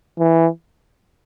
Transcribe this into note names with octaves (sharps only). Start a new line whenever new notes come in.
E3